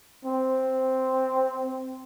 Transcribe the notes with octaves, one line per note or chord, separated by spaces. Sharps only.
C4